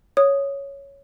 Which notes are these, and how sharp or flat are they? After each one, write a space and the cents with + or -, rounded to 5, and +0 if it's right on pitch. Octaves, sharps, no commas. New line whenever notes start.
C#5 +0 D#6 -5